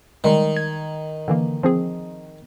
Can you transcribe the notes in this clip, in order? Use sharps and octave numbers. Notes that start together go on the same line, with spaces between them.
D#3 G3 G#3
G#6
D3 E3 A#3
F3 C4 G#4